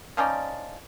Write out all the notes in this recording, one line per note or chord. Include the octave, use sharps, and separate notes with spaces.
F3 C#4 D#4 D5